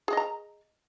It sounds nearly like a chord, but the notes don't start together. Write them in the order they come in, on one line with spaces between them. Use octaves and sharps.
G#4 D#5 A#5